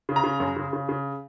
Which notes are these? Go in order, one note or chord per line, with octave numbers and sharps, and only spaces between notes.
C#3
A#5
C#3
F#2
C#3
C#3
C#3